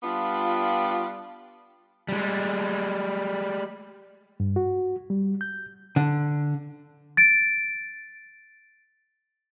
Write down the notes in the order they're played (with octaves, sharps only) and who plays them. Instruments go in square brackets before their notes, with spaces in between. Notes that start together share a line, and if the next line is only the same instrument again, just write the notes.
[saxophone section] G3 B3 D4 F4
[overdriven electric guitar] G3 G#3
[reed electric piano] G2
F#4
G3
G6
[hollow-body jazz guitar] D3
[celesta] A6 D7